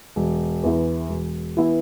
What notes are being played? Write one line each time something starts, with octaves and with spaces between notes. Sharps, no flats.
E1
E2 E3 B3 E4
E1
E3 B3 E4